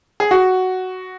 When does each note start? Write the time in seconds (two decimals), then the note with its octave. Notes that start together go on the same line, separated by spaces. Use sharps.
0.20 G#4
0.31 F#4